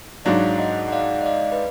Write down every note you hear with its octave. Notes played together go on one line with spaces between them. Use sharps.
G#2 F#3 D4 D5 F5
D#5 F#5
F#5
D5 F5
D#5
D5 F5
B4